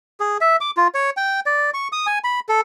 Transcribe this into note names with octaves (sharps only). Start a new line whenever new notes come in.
G#4
E5
D6
F4
C#5
G5
D5
C#6
D#6
G#5
B5
A4